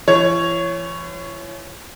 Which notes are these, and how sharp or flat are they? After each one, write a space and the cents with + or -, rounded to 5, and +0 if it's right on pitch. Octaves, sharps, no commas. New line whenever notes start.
E3 +40 C#5 +0